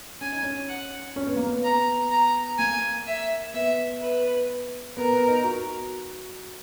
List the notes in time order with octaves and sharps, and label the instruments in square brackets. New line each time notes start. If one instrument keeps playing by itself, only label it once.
[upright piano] C#4 [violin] G#5
[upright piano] D#4
C#4
[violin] F#5
[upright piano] C#4
B3
A#3
B3
[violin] A#5
A#5
[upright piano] A#3 [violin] G#5
[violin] E5
[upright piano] B3 [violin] E5
[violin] B4
[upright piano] B3 [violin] A#4
[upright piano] B3
D#4
F#4